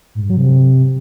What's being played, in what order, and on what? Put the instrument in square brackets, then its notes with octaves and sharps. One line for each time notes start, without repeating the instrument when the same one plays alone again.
[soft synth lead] G#2
G2
F#3
C3